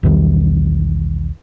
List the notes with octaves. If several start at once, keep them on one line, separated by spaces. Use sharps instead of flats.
B1 E2 D#3 G3